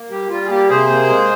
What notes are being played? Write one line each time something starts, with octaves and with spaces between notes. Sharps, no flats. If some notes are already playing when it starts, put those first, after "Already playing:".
Already playing: A#3
G3 G4
G3 F4
G#4
A#3 G4
C3 G#4 C5
A#3
G#3